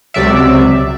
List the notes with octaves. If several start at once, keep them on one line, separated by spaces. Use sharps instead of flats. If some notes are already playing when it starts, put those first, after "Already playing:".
C#2 C3 F#3 D5 E5